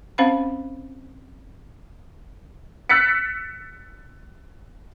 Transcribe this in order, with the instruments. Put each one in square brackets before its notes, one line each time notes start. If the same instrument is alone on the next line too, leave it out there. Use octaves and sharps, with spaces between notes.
[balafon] C4 C#4 C5 F5 F#5 B5
[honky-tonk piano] E6 F#6 A6 B6 C#7